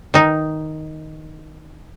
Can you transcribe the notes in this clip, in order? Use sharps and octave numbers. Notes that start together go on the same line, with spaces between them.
D#3 D#4